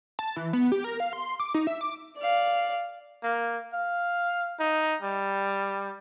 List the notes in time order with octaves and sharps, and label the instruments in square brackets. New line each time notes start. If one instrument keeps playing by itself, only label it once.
[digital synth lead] A5
E3
B3
G4
A#4
F5
C6
D6
D#4
E5
D6
[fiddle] D5 F5
[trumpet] A#3
F5
D#4
G3